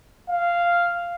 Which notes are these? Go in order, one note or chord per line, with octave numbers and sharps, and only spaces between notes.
F5